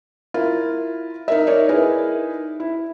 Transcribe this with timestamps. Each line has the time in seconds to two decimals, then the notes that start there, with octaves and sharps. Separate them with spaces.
0.34 E4 F4 A#4
1.28 D#4 A#4 E5
1.47 D#4 A#4 C#5 D5
1.69 D#4 E4 G#4 A#4 B4
2.60 E4